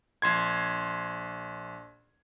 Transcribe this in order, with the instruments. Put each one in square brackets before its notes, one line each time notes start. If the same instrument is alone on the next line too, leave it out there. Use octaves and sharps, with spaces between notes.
[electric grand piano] A#1 C6 G#6